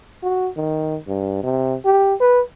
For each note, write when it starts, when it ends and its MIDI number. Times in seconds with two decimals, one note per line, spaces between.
0.23 0.49 66
0.57 0.97 51
1.08 1.39 43
1.43 1.76 48
1.85 2.14 67
2.20 2.41 71